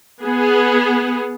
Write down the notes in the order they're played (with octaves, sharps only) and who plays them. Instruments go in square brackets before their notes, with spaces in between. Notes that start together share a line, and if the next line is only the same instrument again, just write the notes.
[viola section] B3 G#4